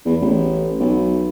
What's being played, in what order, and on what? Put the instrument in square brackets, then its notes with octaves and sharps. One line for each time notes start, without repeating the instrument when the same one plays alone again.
[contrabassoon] E2
A1
B1